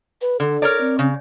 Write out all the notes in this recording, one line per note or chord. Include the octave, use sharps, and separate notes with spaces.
B4
D3 A4
A#4 C#5 D5
C4
C#3